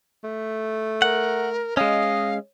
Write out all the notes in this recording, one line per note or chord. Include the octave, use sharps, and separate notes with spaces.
A3
A#4 F#5
G#3 C#4 D#5 F5